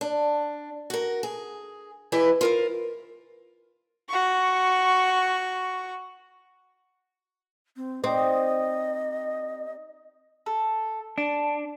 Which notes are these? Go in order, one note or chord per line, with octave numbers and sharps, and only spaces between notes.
D4
F#4 A#4
G#4
E3 E4 G4 G#4 B4 D#5
F4 A#4 C5
F#4 C#6
C4
C4 D#4 G4 D5 D#5
A4
D4 A5